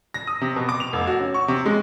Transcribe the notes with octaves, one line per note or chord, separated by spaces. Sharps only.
A#6
D#6
C3
B2
D6
F7
F1
F#4
C#4
C#6
C3
G#3